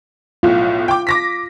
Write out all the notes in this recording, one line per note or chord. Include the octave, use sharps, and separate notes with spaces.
B1 A2 F4
G5 D6
D6 A#6 B6